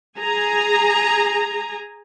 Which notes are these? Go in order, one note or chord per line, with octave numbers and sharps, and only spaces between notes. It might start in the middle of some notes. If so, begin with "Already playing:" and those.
G#4 G#5 A#5